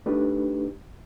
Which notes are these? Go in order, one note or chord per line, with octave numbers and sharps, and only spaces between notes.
A3 D4 D#4 G4 B4